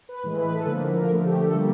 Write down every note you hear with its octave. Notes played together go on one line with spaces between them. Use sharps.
B4
A2 E3 G#3 B4
B4
A4
D3 F3 A#3 B4
A#4
D3 F3 A3 A4
G4
A4
D3 G3 A#3